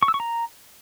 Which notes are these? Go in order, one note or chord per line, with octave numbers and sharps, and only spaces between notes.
C#6
E6
C#6
A#5